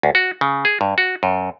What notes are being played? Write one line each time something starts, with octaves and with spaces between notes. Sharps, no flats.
D2
F#4
C#3
G#4
G2
F#4
F#2